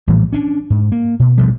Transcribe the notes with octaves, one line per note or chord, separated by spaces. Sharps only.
A#1 A2 E3 G3
C#4 D4
G#2
A#3
B2
A1 B2 F3 G3